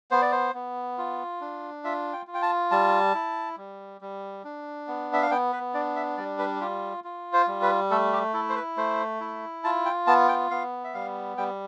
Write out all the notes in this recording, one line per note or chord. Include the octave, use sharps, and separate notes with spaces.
B3 C5
D5
C5
B3
F4
D4
F4 E5
G5
F4
G5
A5
G3 A5
E4
G3
G3
D4
B3
E5
F5
B3 G5
B4
D4 D5
E5
G3 D5
B4
F4 G4
F4
C5
G3
B4
A3 A4
G4
E4 A4
C5
B4
A3 C5
E4
F4 A5
G5
B3 A5
G5
B3 F5
E5
G3 F5
G3 G5